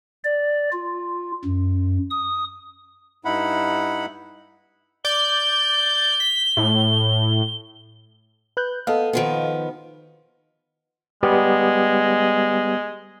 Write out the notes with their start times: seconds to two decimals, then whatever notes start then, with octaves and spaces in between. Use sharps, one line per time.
0.24 D5
0.72 F4
1.45 F#2
2.11 D#6
3.25 G2 D#4 E4 F#5 B5
5.05 D5 G6 G7
6.20 B6
6.57 A2
8.57 B4 F#6 G6
8.87 B3 A4 D#5 F5
9.13 D#3 F3 B3
11.23 G3 G#3 B3 G4